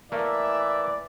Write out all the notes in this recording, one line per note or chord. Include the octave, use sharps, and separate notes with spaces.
E3 A3 A#3 D5 E5